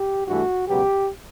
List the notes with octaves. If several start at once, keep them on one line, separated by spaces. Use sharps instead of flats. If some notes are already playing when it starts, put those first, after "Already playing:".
Already playing: G4
G2 E3 A3 F#4
C#2 B2 F#3 B3 G4